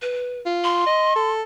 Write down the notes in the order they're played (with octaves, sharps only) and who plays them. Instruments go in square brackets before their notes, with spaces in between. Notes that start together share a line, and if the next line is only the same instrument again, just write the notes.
[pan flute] B4
[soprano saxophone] F4
[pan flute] C6
[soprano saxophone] D#5
A4